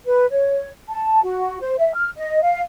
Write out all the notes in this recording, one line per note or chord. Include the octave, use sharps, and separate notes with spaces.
B4
C#5
A5
F#4
C5
E5
F6
D#5
F5